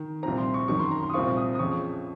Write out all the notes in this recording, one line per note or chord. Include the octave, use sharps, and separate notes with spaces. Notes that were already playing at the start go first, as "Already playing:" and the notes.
Already playing: D#3
C2 A#2 F3 C4 A#5
C6
C#6
F#2 D#3 F#3 C#6
C6
A#5
C6
D#6
C2 A#2 F3 C4 F4 C#6
D#6
D#6
F2 C#3 F3 C#6